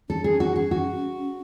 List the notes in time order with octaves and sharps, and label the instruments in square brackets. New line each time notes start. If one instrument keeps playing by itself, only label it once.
[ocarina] C#4 [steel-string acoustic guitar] A4
[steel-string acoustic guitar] G#4
F#4
G#4
F#4